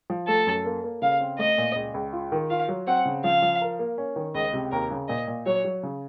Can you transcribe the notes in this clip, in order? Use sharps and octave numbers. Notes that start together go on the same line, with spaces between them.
F3
A3 A4
F#2
A#3
A#3
C#3 F5
C4
A3 D#5
A#2
C#2
C#2
F4
D#3
F4 F5
F#3
C4 F#5
C#3
F3 F5
F3
A#4
A#3
C#4
D#3
C#2 D#5
C3
D#2 A#4
C#3
A#2 D#5
A#2
F#3 C#5
F#3
C#3